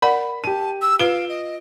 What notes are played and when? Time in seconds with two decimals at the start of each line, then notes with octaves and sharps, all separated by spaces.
0.02 A#4 D5 F#5 B5
0.44 G4 A5 D#7
0.82 E6
0.99 F4 B4 F5 D7 E7 G7
1.29 D#5